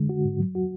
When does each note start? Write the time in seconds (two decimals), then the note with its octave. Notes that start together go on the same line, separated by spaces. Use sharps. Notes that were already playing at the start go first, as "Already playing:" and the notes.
Already playing: D3 G#3
0.09 F#4
0.25 G#2
0.40 F#3
0.55 F#4